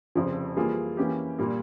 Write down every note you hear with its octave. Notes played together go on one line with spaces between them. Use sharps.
F1 F2 C#3 F3
E3 G3 A#3 F4 G#4
E3 A#3 C#4 G4
A#2 G3 A#3